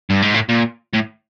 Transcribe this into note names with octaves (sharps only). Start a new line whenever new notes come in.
G2
G#2
A2
A#2
A2